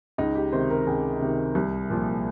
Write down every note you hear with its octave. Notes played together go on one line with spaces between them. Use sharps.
C#2 D#4
G4
C3 D#3 C5
A#4
C#2 G#4
C3 D#3
C2
A#2 F3